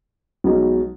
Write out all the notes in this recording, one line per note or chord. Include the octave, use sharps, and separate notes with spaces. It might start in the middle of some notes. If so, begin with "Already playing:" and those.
B1 B2 G#3 D#4